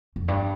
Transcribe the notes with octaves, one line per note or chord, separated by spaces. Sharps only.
F2
G2